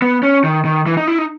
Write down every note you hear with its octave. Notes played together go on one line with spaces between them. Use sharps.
B3
C#4
D#3
D#3
E3
D#4
E4
D#4